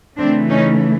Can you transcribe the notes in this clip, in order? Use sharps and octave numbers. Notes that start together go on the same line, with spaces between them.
C#3 E3 A3 C4 D4
C#4 D#4